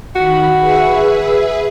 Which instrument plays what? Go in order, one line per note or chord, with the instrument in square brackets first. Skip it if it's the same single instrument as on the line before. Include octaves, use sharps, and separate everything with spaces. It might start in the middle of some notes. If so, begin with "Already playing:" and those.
[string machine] D#3 B5 [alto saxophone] F#4
[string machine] G#4 B4 E5